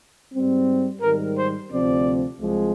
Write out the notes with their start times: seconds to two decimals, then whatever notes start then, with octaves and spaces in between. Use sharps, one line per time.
0.32 G#2 G3 C4
1.01 G#2 D#3 G3 A#4
1.35 C5
1.70 D2 C3 F3 C4 D5
2.39 C2 C3 F3 G#3